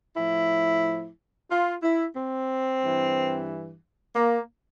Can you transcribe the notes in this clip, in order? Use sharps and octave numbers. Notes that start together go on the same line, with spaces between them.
A2 F3 E4
F4
E4
C4
G2 E3
A#3